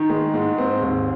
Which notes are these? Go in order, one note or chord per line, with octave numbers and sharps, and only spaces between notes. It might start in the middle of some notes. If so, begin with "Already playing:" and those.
Already playing: D#3
G#3
G#2
C4
D#2